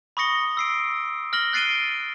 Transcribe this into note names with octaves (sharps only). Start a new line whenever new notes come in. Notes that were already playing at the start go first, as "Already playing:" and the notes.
B5 C#6 D#6 A#6 C#7 G7
E6 C7 D7
F6 A#6 F#7 G7
F#6 A6 C7 D7 D#7 G7